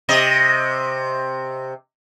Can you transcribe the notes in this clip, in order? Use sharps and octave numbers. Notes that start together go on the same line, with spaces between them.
C3 D#5